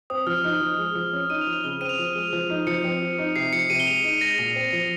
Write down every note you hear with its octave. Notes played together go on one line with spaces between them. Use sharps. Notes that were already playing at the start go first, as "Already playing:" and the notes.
C4 D#6
F3 F6
D#4 F6
F3
G#3
F3
C#4
D#4 D#7
F7
F3
F7
C#3 G7
F7
C4 D#7
F7
F3 D#7
G#3
F3
D#4
F3 C#7
C4
F3
D#4
C3 C7
F3 C#7
C3 D#7
G7
G#3 F7
D#4 D#7
G#3 A#6
A#2 F7
C4 D#7
F3 C#7